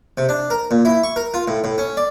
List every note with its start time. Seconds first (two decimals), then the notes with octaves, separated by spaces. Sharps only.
0.17 C3
0.29 D4
0.50 A#4
0.71 A#2
0.85 E4
1.03 C#6
1.16 A#4
1.34 F4
1.48 A2
1.64 A2
1.78 C#4
1.97 D5